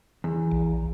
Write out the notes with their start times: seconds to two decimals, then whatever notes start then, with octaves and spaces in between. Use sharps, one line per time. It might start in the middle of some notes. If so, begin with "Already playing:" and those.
0.24 E2
0.52 A#1